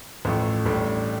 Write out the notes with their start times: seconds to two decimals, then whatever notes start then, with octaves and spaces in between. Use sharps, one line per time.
0.25 A1 A2 F3 A3
0.65 A1 A2 G3 D4